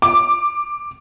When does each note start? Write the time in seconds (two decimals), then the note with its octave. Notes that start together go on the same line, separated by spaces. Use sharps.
0.02 D6